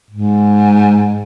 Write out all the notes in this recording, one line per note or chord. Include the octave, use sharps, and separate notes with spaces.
G#2